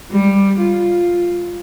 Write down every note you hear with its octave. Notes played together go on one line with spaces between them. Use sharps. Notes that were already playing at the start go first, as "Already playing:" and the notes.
G3
F4